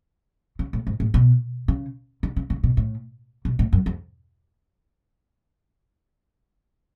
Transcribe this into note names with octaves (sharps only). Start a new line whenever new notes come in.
C#3
A2
G#2
A2
B2
C#3
D3
C#3
C#3
B2
A2
B2
A2
F#2
F2